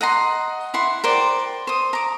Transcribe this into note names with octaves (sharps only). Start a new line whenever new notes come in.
D#5 F#5 A#5 C6
E4 F#5 C6
A#4 C5 D5 G5
C5 D#6
A#5 D6